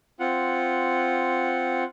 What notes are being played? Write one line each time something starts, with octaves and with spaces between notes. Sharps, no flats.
C4 F4 F#5